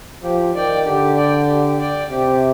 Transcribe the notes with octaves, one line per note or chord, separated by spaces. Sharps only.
F3 G4
D#3 D5 G5
D3 G4
D5 G5
G4
D5 G5
C3 G4